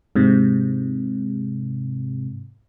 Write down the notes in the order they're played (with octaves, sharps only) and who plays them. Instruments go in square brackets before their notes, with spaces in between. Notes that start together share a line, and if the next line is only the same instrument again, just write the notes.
[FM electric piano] G#2 C3